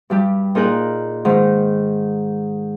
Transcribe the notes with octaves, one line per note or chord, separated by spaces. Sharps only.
G2 G3 G4
A#2 D#4 G#4 A#4 F#6
G#2 D#3